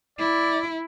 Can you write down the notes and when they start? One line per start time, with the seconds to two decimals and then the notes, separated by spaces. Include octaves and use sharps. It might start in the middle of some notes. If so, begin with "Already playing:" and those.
0.19 E4 D5